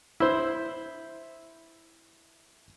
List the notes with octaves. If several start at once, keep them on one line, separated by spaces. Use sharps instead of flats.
E4 C5